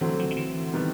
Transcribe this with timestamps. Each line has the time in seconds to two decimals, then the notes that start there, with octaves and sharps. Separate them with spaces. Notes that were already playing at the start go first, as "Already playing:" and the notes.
0.01 D3 E3 F#3 A3 C4
0.19 F3
0.30 D#3
0.36 E3
0.74 C3 D#3 G3 B3